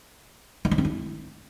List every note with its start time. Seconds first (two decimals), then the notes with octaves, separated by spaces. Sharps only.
0.65 E4
0.71 D#4
0.78 C4
0.85 E4